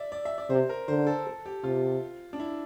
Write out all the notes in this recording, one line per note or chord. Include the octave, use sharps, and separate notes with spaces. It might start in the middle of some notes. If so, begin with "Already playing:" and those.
Already playing: D5 E5
D5
E5
D5
C3 C5
A#4
D3 C5
A4
A4
G4
C3 F4
D4
E4